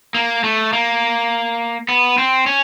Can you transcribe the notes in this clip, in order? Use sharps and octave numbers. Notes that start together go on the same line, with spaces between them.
A#3
A3
A#3
B3
C4
C#4